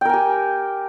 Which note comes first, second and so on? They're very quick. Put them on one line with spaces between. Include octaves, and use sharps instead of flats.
G5 A#4 G#5 G4